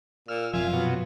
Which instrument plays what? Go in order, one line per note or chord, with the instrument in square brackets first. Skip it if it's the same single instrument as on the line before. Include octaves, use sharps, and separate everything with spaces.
[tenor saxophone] A#2 [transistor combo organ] E6 F6
[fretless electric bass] F#2 C3 F3 [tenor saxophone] F4 [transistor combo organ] E5 F5 G#5
[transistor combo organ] B2 F#3